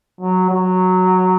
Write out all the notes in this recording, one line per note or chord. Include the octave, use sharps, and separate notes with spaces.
F#3
F#3